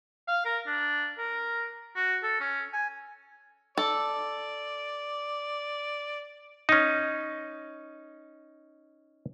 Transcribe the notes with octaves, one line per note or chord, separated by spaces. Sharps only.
F5
A#4
D4
A#4
F#4
A4
C#4
G#5
A4 D5
C#4 D#4